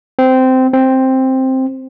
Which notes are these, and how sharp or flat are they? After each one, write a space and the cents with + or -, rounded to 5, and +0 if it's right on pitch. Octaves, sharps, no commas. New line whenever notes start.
C4 -15
C4 +5